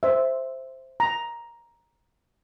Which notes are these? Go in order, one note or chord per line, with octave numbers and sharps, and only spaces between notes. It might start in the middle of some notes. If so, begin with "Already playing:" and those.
C5 E5
A#5